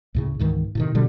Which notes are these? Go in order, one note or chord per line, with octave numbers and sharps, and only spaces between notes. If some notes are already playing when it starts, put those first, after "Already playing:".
D2 A2 C#3
C#2 G#2 D#3 E3
A2 C3 D#3
B2 D3 F3 G3